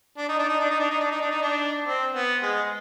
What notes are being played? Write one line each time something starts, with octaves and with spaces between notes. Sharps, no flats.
D4
D#4
D4
D#4
D4
D#4
D4
D#4
D4
D#4
D4
D#4
D4
C4
B3
G#3